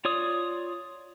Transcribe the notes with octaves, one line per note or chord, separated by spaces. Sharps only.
F4 C#5 D5 D#6